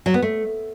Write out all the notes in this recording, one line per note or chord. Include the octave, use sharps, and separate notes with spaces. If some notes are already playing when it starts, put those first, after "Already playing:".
F#3
B3
A3